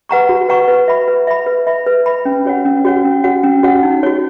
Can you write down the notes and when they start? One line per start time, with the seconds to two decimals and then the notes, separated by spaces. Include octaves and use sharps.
0.09 B4 F#5 A#5 C#6
0.29 F#4
0.49 B4 F#5 A#5 C#6
0.68 B4
0.88 E5 B5
1.08 B4
1.27 E5 B5
1.46 B4
1.67 E5 B5
1.87 B4
2.06 E5 B5
2.25 C#4
2.45 F#4 C#5 F#5
2.65 C#4
2.85 F#4 C#5 F#5
3.04 C#4
3.24 F#4 C#5 F#5
3.43 C#4
3.63 F#4 C#5 F#5
3.83 D#4
4.03 F#4 C#5